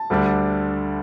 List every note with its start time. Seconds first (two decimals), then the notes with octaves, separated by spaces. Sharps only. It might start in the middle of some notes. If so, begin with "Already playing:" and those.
Already playing: A5
0.10 D2 D3 G3 D4